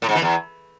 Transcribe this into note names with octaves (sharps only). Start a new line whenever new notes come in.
A2
G#2
E3
E2